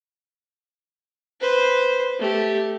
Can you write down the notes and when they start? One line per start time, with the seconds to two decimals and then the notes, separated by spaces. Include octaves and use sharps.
1.41 B4 C5
2.19 A3 G4